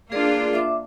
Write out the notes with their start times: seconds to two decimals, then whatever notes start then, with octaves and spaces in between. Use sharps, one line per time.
0.12 A#3 D4 F4 G#4 A#4 D5
0.53 E5 D6